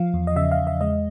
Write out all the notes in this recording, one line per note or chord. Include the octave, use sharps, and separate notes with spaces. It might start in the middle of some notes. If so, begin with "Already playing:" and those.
Already playing: F3 F5
E2
D#5
C#3 E5
F5
E2
E5
G#3 D#5